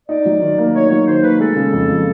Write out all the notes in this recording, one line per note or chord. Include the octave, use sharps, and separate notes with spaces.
D#4 D5
F#3
D#3
A#3
D#4 C#5
F#3 C#5
D#3 C5
A#3 B4
G#3 A4
C#3
F2
F3